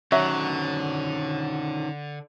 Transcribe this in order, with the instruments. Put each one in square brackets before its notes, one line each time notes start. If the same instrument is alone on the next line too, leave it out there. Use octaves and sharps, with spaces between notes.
[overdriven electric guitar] D3 [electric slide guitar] D#3 C#4 [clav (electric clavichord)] F#3 [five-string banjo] E5